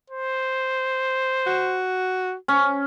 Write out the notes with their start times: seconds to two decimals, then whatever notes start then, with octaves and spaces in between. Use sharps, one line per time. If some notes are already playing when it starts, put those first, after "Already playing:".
0.10 C5
1.47 F#4
2.48 C#4